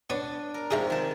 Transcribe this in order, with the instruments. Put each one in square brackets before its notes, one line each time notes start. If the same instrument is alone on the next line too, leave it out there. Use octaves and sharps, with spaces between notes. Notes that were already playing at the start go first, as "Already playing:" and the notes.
[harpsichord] B3 C#5 [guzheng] D4
[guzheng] A#4
[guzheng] G#2 C3 F3 [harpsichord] G#4 E5 A#5
[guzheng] D#3 A5